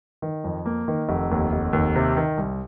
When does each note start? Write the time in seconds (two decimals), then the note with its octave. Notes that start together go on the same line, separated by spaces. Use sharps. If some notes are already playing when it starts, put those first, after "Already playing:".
0.22 D#3
0.44 F2
0.66 A#3
0.88 D#3
1.09 F1
1.31 D#2
1.53 F1
1.73 D#2
1.95 C3
2.17 D#3
2.37 C2